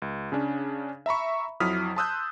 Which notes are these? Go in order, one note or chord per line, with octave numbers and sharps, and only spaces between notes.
C#2
C#3 C#4 D4
E5 A#5 B5 C#6
F2 F#3 E4 D#6 F6 B6
A5 C6 D#6 E6 F#6 G6